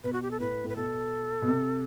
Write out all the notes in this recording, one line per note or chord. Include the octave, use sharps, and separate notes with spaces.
B2 B4
F#4
G4
A4
A2 B4
A2 B4
B2 A4
B2
C3